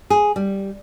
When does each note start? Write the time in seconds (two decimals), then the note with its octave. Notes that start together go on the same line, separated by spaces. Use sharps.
0.10 G#4
0.36 G3